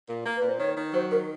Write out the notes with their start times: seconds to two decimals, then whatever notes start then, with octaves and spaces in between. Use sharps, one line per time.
0.08 A#2
0.25 A#3
0.37 A#2 B4
0.49 C5
0.60 D#3 C#5
0.77 D#3
0.94 F#3 C5
1.11 D#3 A#4